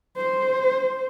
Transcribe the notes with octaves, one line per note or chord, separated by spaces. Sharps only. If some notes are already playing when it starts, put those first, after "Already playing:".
C5